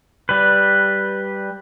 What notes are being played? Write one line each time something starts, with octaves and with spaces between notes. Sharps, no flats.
G3 B4